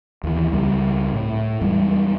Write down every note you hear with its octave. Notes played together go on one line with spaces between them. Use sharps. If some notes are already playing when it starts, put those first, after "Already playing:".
D#2 E3
C#2 G3
A2
E2 G3 G#3